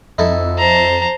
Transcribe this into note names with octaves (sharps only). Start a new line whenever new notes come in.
F2 D#4 E4 A4
C5 A5 A#5